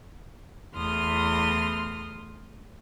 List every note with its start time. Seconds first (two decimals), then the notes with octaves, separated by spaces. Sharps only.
0.74 E2 A3 C6 D#6 F6